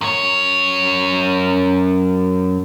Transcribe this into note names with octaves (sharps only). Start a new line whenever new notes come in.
F#2 C#5